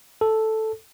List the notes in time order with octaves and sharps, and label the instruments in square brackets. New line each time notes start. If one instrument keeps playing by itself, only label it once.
[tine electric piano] A4